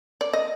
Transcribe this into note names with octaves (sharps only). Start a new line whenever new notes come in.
D5
D#5